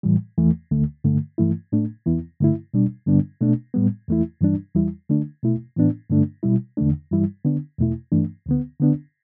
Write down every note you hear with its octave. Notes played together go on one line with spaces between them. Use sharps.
A2 E3 G3
E2 E3 A3
D2 D3 A3
G2 D3 A3
G2 E3 A3 E4
A2 A3 D4
E2 E3 B3 E4
G2 D3 A3 E4
B2 G3 D4
G2 D3 G3 B3 D4
B2 A3 D4
A2 G3 B3
E2 E3 A3 E4
G2 E3 G3 D4
E2 E3 G3 E4
D3 A3 D4
B2 A3 E4
A2 E3 B3 D4
G2 D3 A3 D4
B2 G3 E4
E2 D3 A3 D4
G2 E3 G3 E4
D3 B3 D4
E2 B2 A3 E4
G2 E3 A3 D4
D2 D3 B3
D3 B3 D4